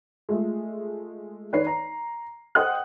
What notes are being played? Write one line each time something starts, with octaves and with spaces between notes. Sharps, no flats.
G#3 A3 F4
D#3 B4 C#5 D5 C7
A#5
C5 D#5 F#5 G5 D#6 F#6